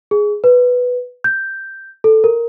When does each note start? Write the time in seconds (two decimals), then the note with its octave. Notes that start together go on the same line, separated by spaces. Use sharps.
0.11 G#4
0.44 B4
1.24 G6
2.04 A4
2.24 A#4